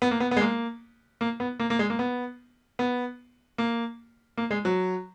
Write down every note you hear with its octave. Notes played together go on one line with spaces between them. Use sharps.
B3
A#3
B3
B3
G#3
A#3
A#3
B3
A#3
A#3
G#3
A#3
B3
B3
A#3
A#3
G#3
F#3